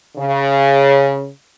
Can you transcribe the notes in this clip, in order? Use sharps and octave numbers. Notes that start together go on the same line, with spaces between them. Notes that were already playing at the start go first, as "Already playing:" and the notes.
C#3